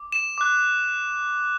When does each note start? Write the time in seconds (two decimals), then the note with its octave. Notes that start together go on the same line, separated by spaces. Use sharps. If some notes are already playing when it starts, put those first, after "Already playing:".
Already playing: D6
0.12 E7
0.38 D6 F#6